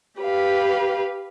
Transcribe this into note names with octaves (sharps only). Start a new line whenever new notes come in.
G4 B4 F5